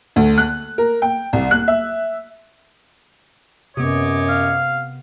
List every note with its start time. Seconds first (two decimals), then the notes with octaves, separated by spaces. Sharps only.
0.16 D2
0.38 F#6
0.78 A#4
1.02 G5
1.33 C2
1.51 F#6
1.68 E5
3.77 F#2 C3 B3 C#5 D#5 D6
4.29 F5